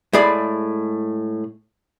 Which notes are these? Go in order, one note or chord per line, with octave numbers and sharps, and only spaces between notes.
A2 G#3 G#4 D5 B5